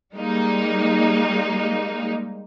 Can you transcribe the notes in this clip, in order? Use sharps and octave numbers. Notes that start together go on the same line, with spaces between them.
G3 G#3 A#3 D#4